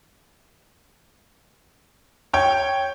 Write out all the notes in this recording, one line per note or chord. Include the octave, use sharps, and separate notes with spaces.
C#5 G5